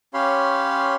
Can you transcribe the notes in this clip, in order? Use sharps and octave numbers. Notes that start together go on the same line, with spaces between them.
C#4 G4 C#5 F5 B5 C6